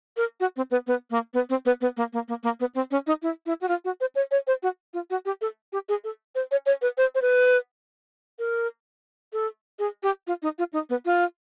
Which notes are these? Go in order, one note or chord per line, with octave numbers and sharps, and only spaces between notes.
A#4
F#4
C4
B3
B3
A#3
B3
C4
B3
B3
A#3
A#3
A#3
A#3
B3
C4
C#4
D#4
E4
E4
F#4
F4
F#4
C5
C#5
C#5
C5
F#4
F4
F#4
G4
A4
G4
G#4
A4
C5
C#5
C#5
B4
C5
C5
B4
A#4
A4
G#4
G4
F4
D#4
F4
D#4
B3
F4